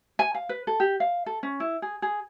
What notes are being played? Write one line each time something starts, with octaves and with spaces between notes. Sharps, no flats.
G#5
F5
B4
A4
G4
F5
A4
C#4
E4
G#4
G#4